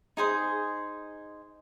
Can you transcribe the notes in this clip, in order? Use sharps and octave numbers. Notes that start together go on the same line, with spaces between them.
D#4 G#4 C5